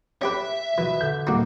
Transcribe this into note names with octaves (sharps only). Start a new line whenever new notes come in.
C#4 G4 B4 E5
B2 E3 B4
D3 G6
D#1 A#3 D#4 F#4 D6